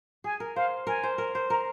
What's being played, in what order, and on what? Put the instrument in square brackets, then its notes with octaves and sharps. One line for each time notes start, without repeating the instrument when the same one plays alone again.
[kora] G#4 [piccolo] G#5
[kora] A#4
[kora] C5 [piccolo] F5
[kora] A#4 [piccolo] G#5
[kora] C5
A#4
C5
[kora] A#4 [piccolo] A#5